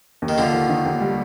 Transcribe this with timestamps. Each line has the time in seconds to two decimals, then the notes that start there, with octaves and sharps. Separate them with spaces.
0.22 D#2
0.28 D#3
0.38 D#2 D3 F3
0.53 D#3
0.69 D#3
0.85 D#2
1.01 G3